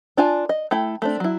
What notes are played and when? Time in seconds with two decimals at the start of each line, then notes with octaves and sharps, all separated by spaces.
0.17 D4 F4 G#5 A5
0.49 D#5
0.71 A3 E4 A4 G5
1.02 A3 C4 D4
1.20 F#3 E4